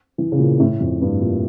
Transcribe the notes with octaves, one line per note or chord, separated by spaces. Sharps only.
E3
C#3
A#2
A2
F2
G2
A#2